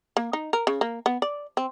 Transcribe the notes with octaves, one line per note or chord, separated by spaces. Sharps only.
A#3
D#4
A#4
C#3
A#3
B3
D5
C4